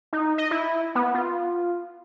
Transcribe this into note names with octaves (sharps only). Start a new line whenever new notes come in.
D#4
D#5
E4
B3
F4